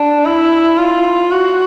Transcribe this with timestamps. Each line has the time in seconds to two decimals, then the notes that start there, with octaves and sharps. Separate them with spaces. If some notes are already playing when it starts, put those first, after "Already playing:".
Already playing: D4
0.25 E4
0.78 F4
1.32 F#4